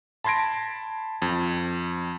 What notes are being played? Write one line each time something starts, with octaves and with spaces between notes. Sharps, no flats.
A5 B5 C6 G#6 A#6 D7
F2